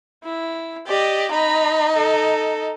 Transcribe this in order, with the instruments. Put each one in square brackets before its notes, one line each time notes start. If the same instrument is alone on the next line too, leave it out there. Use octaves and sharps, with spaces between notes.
[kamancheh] E4
[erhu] G4 [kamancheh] D5 D#5
[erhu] D#4 [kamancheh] A#5 B5
[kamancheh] A4